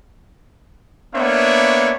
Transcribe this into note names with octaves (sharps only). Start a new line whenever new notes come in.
A#3 B3 D4 C#5 E5